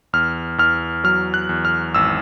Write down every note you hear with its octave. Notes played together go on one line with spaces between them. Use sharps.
E2 F6
E2 F6
F#3 F6
F#6
E2
F6
G#1 E6